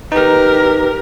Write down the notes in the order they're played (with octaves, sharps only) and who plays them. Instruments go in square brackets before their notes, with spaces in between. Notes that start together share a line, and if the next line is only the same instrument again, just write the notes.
[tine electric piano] D#4 [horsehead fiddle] G4 A#4 [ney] B4